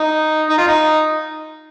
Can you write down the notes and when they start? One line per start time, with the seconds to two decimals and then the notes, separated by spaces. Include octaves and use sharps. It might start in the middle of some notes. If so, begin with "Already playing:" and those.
Already playing: D#4
0.50 D#4
0.58 F4
0.67 D#4